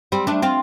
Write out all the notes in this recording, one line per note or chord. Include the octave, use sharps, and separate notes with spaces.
G3 C4
A3 D4
C4 F4